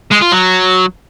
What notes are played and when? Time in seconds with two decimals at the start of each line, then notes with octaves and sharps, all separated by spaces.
0.11 G#3
0.21 F4
0.32 F#3